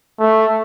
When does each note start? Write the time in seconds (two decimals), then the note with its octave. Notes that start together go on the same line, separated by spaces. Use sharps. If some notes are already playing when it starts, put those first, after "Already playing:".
0.20 A3